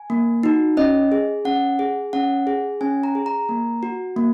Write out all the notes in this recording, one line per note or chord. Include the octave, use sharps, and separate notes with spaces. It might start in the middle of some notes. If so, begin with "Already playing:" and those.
Already playing: G#5
A#3
D#4 F#4
C#4 D#5
G#4
C#4 F#5
G#4
C#4 F#5
G#4
C#4 G#5
A#5
G#4
A#5
A#3
F#4
A#3